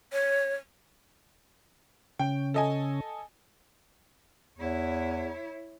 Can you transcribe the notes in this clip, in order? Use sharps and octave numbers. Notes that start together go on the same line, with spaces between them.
C#5
C#3 C#4 G5
A4 D#5 G#5
E2 E4 C#5